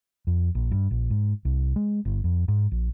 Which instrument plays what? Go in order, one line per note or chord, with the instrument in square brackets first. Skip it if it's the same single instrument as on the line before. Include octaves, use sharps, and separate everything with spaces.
[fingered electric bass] F2
A#1
G2
A#1
G#2
C2
G#3
G1
F2
G#2
A#1